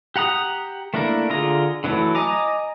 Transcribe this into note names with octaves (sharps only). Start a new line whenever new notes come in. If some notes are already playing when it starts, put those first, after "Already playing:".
G4 F#5 A#5 D#6
A3 A#3 D4 E4 A#4
D3 F4 G#4 A#5
D3 E3 F#3 A3 E4
D#5 G#5 A#5 D6